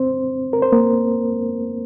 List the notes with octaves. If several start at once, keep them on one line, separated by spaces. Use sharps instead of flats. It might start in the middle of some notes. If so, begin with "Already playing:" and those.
Already playing: C4 C5
A#4
C5
A#3 A#4